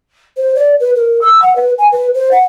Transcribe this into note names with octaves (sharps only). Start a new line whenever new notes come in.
C5
D5
B4
A#4
E6
F#5
B4
G#5
B4
C5
F#5